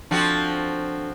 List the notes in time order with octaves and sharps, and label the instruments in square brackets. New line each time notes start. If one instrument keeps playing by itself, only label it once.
[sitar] F3 C4 F#4 [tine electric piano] D4 A4